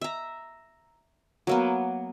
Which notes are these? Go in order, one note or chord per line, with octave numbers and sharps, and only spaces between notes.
E5 A#5
F#3 A#3 B3